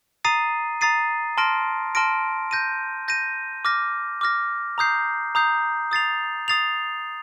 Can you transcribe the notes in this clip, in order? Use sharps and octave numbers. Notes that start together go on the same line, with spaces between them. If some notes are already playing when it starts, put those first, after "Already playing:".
A#5 D#6 A6 C7 D#7
A#5 D#6 A6 C7 D#7
A5 C6 F6 A#6 D7
A5 C6 F6 A#6 D7
G6 A#6 D#7
G6 A#6 D#7
D6 F6 A#6
D6 F6 A#6
A#5 D#6 G6 C7
A#5 D#6 G6 C7
D#6 A6 C7 F7
D#6 A6 C7 F7